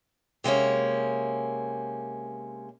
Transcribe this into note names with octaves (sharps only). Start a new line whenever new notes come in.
C3 G#3 A#3 C#4